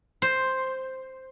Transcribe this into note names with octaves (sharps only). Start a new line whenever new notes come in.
C5